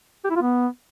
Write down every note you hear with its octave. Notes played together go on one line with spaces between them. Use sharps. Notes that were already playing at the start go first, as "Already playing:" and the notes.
G4
E4
F4
B3